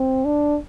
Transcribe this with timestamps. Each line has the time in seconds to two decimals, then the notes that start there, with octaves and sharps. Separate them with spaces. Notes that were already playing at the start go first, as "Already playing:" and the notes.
Already playing: C4
0.25 D4